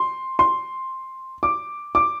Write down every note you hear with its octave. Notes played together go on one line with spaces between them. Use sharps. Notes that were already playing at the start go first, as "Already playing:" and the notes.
Already playing: C6
C6
D6
D6